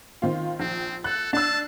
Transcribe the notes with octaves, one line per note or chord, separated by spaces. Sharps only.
D#3 C4 F4
A#1 C4
A4 F#6
D4 A5 E6